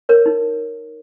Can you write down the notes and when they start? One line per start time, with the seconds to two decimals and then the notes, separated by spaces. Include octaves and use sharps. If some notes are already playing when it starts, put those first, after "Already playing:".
0.09 A#4 C#5
0.26 D#4